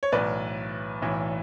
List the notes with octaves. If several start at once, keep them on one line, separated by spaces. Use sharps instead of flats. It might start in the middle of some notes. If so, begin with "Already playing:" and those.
C#5
B1 A2 E3 B4 D5
B1 A2 E3